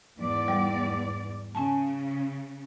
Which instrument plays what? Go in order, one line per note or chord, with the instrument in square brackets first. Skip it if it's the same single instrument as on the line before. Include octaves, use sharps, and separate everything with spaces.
[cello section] E2 G#2 D5
[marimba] G3 F#5
[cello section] C#3 [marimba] C#4 G#5 A5